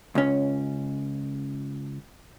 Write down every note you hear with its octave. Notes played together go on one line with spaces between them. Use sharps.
C#2 C#4